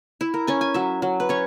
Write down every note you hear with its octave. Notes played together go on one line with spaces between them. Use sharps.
E4
A#4
C#4 G#5
G#5
F#3 E5
F#3
B4
C#4 C#5